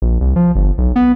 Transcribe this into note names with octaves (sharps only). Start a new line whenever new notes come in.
A#1
C2
F3
G1
B1
B3